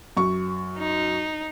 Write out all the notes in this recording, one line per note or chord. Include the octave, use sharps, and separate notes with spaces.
F#2 C#6
D#4